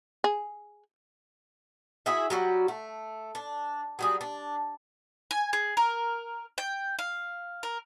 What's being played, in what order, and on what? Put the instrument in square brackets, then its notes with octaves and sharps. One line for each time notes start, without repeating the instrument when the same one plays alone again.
[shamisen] G#4
[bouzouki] E4 F#4 G#4 E5
F#3 G3 F#4
A3
D4
F#3 G3 G#4
D4
[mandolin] G#5
G#4
A#4
G5
F5
A#4